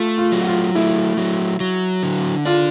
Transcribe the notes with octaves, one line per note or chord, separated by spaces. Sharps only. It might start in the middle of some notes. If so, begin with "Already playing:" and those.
Already playing: A3 F4
F4
F#3
F#4
F4
A3 E4
F#3
F#3
D3
D4 F4